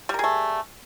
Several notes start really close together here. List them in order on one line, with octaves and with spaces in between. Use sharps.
G3 A#4 G#4 A3